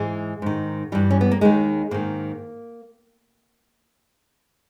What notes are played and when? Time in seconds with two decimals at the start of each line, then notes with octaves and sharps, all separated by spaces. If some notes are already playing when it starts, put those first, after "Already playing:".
Already playing: G#2 E3 G#3
0.42 G#2 D#3
0.92 G2 E3 G3
1.11 C#4
1.21 B3
1.32 A#3
1.41 D#2 D#3 G#3
1.91 G#2 D#3 A#3